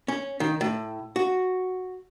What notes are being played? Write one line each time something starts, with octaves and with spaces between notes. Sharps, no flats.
C#4
D#3
A2
F#4